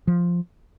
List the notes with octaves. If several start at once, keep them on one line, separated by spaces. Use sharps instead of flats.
F3